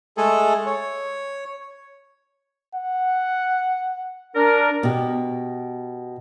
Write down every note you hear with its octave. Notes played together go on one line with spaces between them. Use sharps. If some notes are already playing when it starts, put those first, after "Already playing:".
G#3 A3 G#4 A4
C#5
F#5
D4 A#4
B2 G4